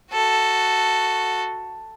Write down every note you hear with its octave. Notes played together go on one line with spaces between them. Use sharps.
F#4 A4